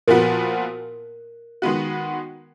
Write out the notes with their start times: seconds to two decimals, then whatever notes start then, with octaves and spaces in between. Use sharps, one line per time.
0.08 A#2 F3 B3 F#4 A#4
1.62 D#3 G#3 B3 F#4